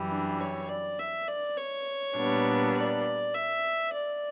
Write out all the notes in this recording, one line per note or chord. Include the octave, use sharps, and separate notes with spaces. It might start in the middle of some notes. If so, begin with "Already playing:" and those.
Already playing: F#2 E3 G3
D4
C#5
D5
E5
D5
C#5
A#2 G3 B3 D4
D5
E5
D5